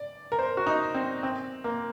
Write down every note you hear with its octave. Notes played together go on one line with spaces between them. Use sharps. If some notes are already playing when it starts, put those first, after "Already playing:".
Already playing: D5
A#4
C5
F#4
D#4
C4
C4
A#3